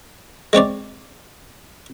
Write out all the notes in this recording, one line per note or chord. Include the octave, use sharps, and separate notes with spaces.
G#3 C4 C#5 D5